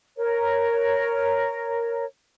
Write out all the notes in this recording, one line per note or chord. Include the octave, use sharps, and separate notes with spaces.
A#4 C#5